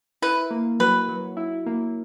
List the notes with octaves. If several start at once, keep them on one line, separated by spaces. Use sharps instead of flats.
E4 B4
A#3
F#3 B4
F#3
E4
A#3